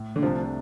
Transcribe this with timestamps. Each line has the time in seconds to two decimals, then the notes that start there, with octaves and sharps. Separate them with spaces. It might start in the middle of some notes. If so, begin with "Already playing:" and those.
Already playing: A2
0.16 D3
0.22 C2 C3 F3 A3 D4